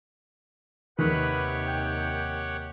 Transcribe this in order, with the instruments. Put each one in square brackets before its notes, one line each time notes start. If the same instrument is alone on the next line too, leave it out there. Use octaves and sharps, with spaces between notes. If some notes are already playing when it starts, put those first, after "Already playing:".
[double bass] D#2 C3 [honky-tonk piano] D#3 [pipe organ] G4 C#5 F#5 [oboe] B4
[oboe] G5